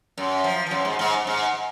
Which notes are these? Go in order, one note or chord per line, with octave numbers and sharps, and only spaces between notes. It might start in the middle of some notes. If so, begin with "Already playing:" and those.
F#2
F3
F3
F#2
G#2
G#2
G#2